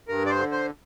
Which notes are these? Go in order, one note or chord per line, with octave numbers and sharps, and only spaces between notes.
G2 A#4
D5
C5
D3
C5